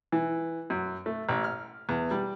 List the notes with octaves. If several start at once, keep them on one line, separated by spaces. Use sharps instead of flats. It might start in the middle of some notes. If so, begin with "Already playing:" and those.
E3
F#2
A3
A1
F6
E2
G3